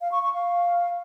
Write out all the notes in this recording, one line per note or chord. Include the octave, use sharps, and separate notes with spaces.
F5
C#6
C#6
F5